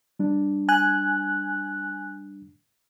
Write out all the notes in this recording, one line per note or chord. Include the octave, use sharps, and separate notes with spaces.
G3 D4
G#5 F#6